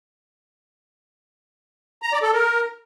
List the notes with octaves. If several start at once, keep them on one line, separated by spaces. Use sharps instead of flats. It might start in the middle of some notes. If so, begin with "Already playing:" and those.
A#5
D5
A4
A#4